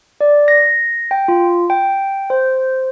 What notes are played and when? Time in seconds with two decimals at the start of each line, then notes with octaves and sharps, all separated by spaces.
0.21 D5
0.48 A#6
1.11 G5
1.28 F4
1.70 G5
2.30 C5